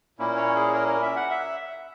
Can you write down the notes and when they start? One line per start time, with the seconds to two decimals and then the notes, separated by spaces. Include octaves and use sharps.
0.18 A#2 A#3 C#4 E4
0.37 C#5
0.56 G#4
0.75 A#4
0.89 A#4
1.02 E5
1.16 F#5
1.31 E5